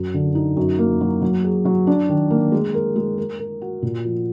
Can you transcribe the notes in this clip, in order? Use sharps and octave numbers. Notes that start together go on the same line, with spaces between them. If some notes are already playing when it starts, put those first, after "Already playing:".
Already playing: F#2
D3
D#4
F#2
A#3
F#3
F#3
G#4
F#3
D4
D#3
A#3
G#3
A#4
G#3
A#4
A#4
F#4
A#2
F3